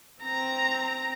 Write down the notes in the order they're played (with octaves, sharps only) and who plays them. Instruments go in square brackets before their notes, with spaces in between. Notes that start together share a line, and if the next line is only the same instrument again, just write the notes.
[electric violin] C4 A#5